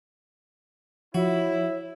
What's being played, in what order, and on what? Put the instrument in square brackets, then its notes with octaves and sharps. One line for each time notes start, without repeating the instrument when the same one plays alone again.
[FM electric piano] F3 [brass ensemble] E4 [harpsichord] F#4 [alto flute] C#5